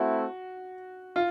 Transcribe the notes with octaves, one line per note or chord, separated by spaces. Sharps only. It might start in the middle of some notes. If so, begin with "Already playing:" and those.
Already playing: A3 C4 E4 F#4
F4